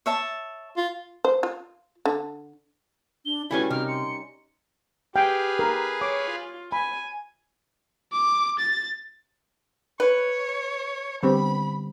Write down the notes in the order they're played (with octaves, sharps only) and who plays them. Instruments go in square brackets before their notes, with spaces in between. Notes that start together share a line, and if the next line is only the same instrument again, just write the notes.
[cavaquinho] C#5 E5 A5
[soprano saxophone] F4
[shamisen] C5
F4
D3
[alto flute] D4 [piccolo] G7
[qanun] C#3 G3 C#4 [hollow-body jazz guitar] E4 A4 B4 [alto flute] F#4 [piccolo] G#5
[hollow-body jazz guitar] C3 [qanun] D#4 A#4 G5 [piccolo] F6
[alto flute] C6 [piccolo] C#7
[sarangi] G4 [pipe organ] G#4 B4 F5 [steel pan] G5
[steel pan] A#4
[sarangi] C#5 [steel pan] D6
[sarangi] F4
[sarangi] G#5 [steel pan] B5
[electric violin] D6
A6
[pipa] B4 [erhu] C#5
[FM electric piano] D3 G3 [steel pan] B3 C4 G4 [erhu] B5